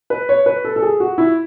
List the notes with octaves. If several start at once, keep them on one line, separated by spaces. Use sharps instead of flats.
B4
C#5
B4
A4
A4
G#4
F#4
E4